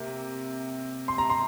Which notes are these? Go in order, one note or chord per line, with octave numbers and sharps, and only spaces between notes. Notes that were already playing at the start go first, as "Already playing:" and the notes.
Already playing: C3 A#3
C6
A#5
C6